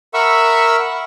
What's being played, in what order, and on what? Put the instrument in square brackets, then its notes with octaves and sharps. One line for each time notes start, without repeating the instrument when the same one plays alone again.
[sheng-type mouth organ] A#4 E5 F#5 B5 C#6 E6